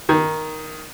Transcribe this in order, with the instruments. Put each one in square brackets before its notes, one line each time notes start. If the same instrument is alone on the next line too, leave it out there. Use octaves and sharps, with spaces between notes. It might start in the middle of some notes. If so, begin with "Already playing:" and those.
[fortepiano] D#3